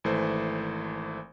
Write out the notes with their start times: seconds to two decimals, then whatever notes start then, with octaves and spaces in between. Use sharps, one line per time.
0.04 G#1 E3 A3 C5